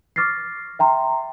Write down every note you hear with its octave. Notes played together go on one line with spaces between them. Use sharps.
C#6 D6 F6 A6 A#6 C7
E5 G5 A#5 C6